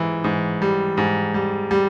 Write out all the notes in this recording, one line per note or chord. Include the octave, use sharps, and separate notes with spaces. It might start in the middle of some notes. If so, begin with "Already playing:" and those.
Already playing: G#2 E3
G#2
G3
G#2
G3
G3